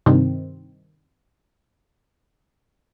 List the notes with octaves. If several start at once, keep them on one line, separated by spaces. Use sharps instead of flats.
G2 C3 D#3 C4